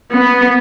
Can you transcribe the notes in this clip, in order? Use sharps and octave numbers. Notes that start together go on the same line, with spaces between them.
B3